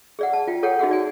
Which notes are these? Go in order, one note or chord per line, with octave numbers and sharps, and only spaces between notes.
G#4 D5 F#5
A5
F4 G5
G#4 A4 C#5 F#5 G5
D#4 F#4 G#4 F#5
D5 G#5